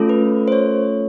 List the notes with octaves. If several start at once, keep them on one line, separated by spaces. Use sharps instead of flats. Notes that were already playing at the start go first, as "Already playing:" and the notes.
Already playing: A3 C#4 F4 A4
B4
C5
C#5